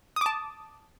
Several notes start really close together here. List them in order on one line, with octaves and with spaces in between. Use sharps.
D#6 D6 A5